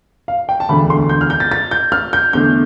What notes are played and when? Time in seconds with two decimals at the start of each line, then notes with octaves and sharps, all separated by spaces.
0.28 F5
0.49 G5
0.60 A5
0.69 E1 D2 D3 B5
0.90 C6
1.09 G6
1.21 F6
1.30 G6
1.40 A6
1.51 A6
1.71 G6
1.92 F6
2.13 G6
2.33 E2 D3 A3 G6